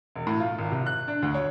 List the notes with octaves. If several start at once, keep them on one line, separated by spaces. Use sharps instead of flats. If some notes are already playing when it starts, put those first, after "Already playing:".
E1
A2
F4
G#1
C3
F#6
D4
D2
C#5